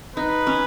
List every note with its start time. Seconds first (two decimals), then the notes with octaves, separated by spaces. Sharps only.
0.16 D#4 B4
0.47 C#4